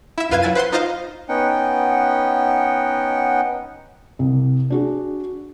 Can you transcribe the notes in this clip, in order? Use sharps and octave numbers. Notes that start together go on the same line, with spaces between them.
E4 E5
C2 F#2 F4 B4 F5 G#6
F#3 E4 G#5 A6 D#7
B4 C5 F#5 C6
D#4 F4 C5 D#5 F5
B3 C#4 D#4 F#5 G5
C2
D4 F#4 G#4